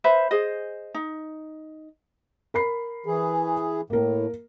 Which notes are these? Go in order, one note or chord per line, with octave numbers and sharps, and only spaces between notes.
B4 C5 E5 B5
G#4 C5 D#5
D#4
A#4 B5 C7
E3 G#4
A2 A#3 A#4